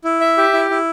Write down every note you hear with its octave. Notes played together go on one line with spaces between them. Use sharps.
E4
E5
G4
E4
E4